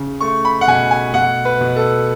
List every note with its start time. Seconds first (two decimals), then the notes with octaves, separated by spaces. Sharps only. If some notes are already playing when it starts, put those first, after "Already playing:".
Already playing: C#3
0.21 A3 C#6
0.45 B5
0.61 F#5
0.68 B2 G#5
0.91 G#5
1.14 B2 F#5
1.45 B4
1.61 B2
1.76 A4